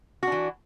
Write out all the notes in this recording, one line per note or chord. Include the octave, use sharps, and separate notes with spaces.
E3 D4 F#4